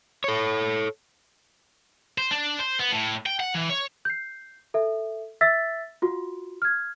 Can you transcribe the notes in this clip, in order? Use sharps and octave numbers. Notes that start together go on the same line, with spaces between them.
A4 C#5
C5
D4
C5
B3
A2
G5
F#5
E3
C#5
G6 C7
A4 E5
E5 E6 A6 B6
F4 F#4
F6 G#6